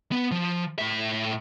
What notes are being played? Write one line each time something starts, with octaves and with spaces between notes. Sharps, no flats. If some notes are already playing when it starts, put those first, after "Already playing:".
B3
F3
A2 E5